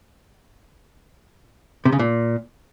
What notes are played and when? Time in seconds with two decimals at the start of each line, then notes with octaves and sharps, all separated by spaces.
1.85 C3
1.92 C#3
1.99 A#2